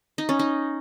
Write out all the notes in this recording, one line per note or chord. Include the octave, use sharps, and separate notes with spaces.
D#4
C#4
D#4